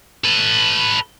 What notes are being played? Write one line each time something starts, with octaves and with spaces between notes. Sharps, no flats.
A4 B4